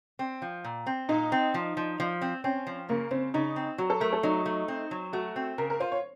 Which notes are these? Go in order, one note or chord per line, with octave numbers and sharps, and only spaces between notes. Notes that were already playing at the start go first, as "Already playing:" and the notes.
C4
F3
A#2
C4
A#2 D#4
C4
F3
F3
F3
C4
C4 C#4
F3
C#3 A#3
C#3 C4
C#3 D#4
C4
F#3 F#4
A4
A3 A#4
A4
F#3 D#4
A3
C4
F#3
A3 F#4
C4
C#3 A#4
A#4
F4 C5
C#5